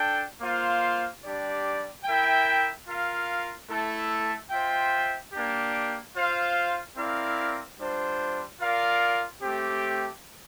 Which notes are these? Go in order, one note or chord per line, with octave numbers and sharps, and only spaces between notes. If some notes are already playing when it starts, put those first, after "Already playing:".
Already playing: D4 A4 G5
A#3 F4 C5 F5
G3 D4 G4 D5
E4 A#4 E5 G5
F4 A#4 F5
A3 E4 A4
F4 C5 E5 G5
A#3 D4 G4
F4 C5 F5
C4 E4 A#4 D5 F5
G3 D4 F4 C5
F4 A#4 D5 F5
A3 C4 G4